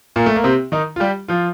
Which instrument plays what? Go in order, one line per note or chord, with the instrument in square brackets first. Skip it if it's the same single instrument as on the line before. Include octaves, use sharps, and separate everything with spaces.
[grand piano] A#2 A#3
A3
A#3
C3 C4
D#3 D#4
F4
G3 G4
F3 F4